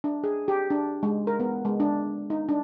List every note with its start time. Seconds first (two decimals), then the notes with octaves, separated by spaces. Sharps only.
0.04 D4
0.24 G#4
0.48 G4
0.70 D4
1.03 G#3
1.27 A#4
1.40 B3
1.65 G#3
1.80 D4
2.30 D#4
2.49 D4